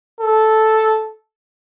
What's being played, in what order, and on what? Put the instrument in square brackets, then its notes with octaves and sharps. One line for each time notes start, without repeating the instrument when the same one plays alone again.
[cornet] A4